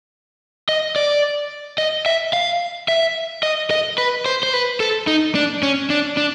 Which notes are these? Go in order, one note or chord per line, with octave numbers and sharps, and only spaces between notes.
D#5
D5
D#5
E5
F5
E5
D#5
D#5
B4
C5
C5
B4
A4
D#4
D4
C#4
D4
D4